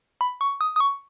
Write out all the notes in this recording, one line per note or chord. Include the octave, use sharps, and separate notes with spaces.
B5
C#6
D#6
D#6
C#6